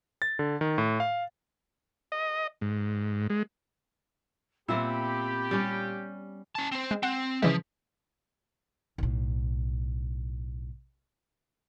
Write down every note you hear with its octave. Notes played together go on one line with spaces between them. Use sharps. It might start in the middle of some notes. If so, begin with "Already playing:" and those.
A6
D3
D#3
A2
F5
D#5
G#2
G#3
A#2 B3 C4 G4 E5 B5
G3 C#4
C#4 A5
C4 C5
G#3
C4 F#5
C#3 E3 F3 G#3
B1 A2